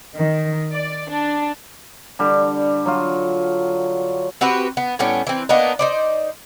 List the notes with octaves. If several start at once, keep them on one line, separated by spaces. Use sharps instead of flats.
D#3
D5
D4
D3 G3
F#3 F4
C4 F#4 G4 B4
B3
A2 G3 B3 C#4
E3 C4
A#3 B3 D4 D#4
D#4 C5 D5